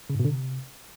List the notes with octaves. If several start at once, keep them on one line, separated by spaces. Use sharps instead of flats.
C#3
G#2
B2
D3
C3